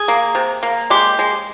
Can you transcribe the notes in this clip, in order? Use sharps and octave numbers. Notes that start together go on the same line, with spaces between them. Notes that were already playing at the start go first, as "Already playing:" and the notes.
Already playing: G#4
A#3
C3
A#3
G#3 G4
G#3